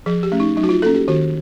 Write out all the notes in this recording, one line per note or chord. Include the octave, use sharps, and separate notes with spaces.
F3 G#4
G4
A3 C#4
D#4
F#3 D#4
F#4
F4
A#3 C#4 A4
G4
D#3 F#4